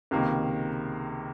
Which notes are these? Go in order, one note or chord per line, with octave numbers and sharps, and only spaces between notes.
C#2 C3 D#3 A#3